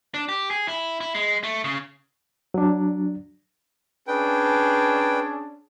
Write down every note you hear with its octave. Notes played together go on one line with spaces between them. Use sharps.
D4
G4
G#4
E4
E4
G#3
A3
C#3
F#3 D4
C#4 D4 G#4 B4 G5